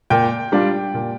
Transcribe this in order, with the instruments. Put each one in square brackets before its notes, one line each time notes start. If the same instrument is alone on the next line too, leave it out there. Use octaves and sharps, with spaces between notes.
[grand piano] A#2 [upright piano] G5
[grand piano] G3 D4 F4
A#2